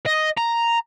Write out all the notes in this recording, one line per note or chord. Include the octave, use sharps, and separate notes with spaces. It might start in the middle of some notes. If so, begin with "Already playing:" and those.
D#5
A#5